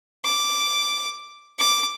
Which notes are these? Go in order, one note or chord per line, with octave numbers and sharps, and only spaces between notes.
D6
D6